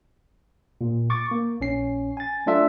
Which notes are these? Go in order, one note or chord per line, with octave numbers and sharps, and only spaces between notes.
A#2
C#6 D6 A6
A#3
A#1 C#4 C7
G#5 A6
F#3 A3 D4 F4 E5